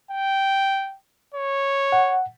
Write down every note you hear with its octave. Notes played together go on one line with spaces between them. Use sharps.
G5
C#5
F#5